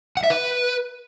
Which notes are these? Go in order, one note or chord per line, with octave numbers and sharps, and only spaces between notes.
F#5
E5
B4